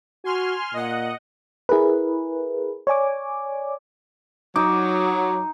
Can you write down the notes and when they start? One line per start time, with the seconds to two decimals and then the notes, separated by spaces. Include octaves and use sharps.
0.24 F#4 G#5 C6 F6
0.74 A#2 D#5 F#5
1.69 E4 G#4 A#4 B4
2.87 C#5 D5 G#5 D6
4.56 F#3 D#4 D6